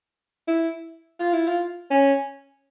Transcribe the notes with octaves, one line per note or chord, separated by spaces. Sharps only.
E4
F4
E4
F4
C#4